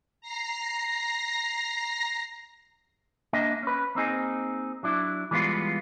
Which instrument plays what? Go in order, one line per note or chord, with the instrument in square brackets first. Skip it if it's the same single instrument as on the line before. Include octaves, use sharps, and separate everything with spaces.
[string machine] A#5 A#6 C7
[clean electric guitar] A#3 D4 D#5 E5
C#4 B4
A#3 C4 D#4 G#4
F#3 D4 E4
E3 G3 G#3 B3 F4